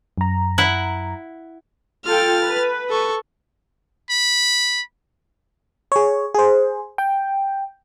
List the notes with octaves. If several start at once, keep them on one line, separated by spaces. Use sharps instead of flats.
F#2 A#5
E4 F#5
F4 A4 G5 F6 A6
B4
A4 C#6
B5
G#4 C#5
G#4 C5
G5